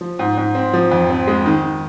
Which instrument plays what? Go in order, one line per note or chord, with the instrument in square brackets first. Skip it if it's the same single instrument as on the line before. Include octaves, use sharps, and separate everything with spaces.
[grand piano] F3
G#2
G#2
C4
F3
F2
C4
G#3
D#3